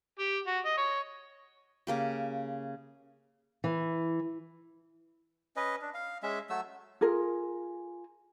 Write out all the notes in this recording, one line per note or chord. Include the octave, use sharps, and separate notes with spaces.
G4
F#4
D#5
C#5
C#3 A#3 G4
E3
C#4 B4 D#5
D4
F5
G#3 C#4 E5
F#3 A3 E6
F4 G#4 A#4